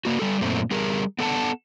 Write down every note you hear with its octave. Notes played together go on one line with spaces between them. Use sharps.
A#3 F#4
G3 A4
F#2 A#2 A3 C4
G3 G#4 A#4
B3 A4 F#5 A5